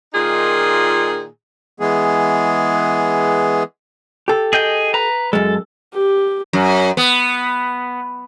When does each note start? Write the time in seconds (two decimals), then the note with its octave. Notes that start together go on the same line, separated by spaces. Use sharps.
0.14 A#2 D#3 D#4 F4 G#4
1.80 E3 G#3 B3 G#4
4.28 G4 A4
4.53 G#4 D#5 G5
4.94 B4 A#5
5.33 F#2 G#3 A4
5.93 G4
6.53 F#2
6.97 B3